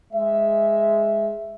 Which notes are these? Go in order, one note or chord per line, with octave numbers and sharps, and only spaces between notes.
G#3 E5